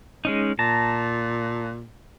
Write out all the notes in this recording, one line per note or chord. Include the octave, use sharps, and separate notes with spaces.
G#3 C#4 D#4
A#2 A5 A#5